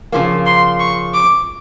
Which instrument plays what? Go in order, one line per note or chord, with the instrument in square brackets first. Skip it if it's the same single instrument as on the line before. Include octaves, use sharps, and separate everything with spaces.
[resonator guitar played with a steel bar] C#3 F3 A#3
[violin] C6
C#6
D6